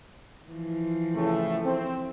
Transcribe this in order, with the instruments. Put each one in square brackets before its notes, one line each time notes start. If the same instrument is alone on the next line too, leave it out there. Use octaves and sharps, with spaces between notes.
[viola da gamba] E3 F3
[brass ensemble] A2 C#3 A3
C4